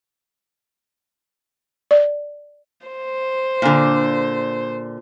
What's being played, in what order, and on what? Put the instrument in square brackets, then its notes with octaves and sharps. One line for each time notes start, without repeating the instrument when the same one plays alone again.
[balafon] D5
[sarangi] C5
[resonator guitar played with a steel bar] A#2 D3